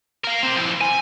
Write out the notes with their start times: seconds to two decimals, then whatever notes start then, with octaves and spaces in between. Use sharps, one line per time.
0.24 A#4 F5
0.43 C4 G4
0.56 F3 E4
0.81 G#5